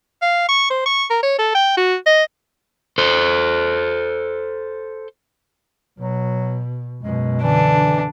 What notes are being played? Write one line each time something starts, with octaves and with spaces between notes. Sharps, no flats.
F5
C#6
C5
C#6
A#4
C#5
A4
G5
F#4
D#5
A4 C5
B2 F#3
F#2 B2 G#3
D3 E3 D4